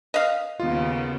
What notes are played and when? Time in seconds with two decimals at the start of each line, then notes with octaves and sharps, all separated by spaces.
0.14 D#5 F5
0.60 D#2 C#3 B3 F4